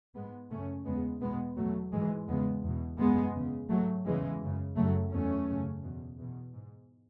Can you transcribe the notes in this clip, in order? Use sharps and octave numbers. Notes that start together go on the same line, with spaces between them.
G#2 G#3 B3
F#2 C#3 A3 C#4
E2 C#3 G#3 B3
E2 B2 G#3 B3
E2 B2 F#3 A3
G#2 E3 G#3
E2 C#3 G#3 B3
E2 B2
F#2 C#3 G#3 B3
E2 C#3
G#2 F#3 A3
E2 C#3 E3 G#3
F#2 C#3
F#2 C#3 F#3 A3
E2 B2 A3 C#4
F#2 C#3
E2 B2
E2 B2
G#2